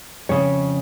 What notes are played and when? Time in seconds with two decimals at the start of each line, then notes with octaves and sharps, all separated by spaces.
0.29 F2 C#3 C#5